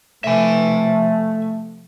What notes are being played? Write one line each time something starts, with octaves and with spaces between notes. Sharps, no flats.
C3 F3 A3 E5 G#5